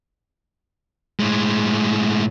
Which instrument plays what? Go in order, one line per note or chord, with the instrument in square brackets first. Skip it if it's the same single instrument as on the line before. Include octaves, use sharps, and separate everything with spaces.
[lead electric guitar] A2 G#3